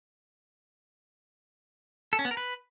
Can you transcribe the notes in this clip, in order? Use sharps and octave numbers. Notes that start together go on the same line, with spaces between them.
A4
C#4
B3
A#4
B4